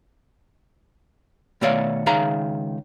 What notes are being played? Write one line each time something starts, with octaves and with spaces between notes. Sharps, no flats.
B2 D#3 A3 C#5 D5 F5
C#2 D#3 G#4 E5 F5 A#5